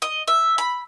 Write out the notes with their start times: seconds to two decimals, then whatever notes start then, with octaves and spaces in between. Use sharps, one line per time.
0.02 D#5
0.28 E5
0.58 B5